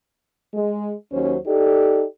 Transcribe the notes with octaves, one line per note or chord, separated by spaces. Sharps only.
G#3
D#2 F#3 C#4 C5
D#4 G4 A4 D5